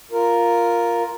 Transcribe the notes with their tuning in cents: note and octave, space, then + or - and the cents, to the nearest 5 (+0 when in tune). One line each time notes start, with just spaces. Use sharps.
F4 +0 A#4 +0